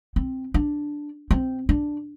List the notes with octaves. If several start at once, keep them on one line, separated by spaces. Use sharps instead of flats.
C4
D4
C4
D4